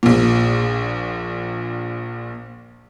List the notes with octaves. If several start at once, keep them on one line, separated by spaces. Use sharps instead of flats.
A#1 A#2